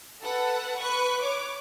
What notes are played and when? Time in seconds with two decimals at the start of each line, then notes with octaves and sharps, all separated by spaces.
0.21 A4 B4 F#5
0.79 B4 C#6 F#6
1.20 C#5 D6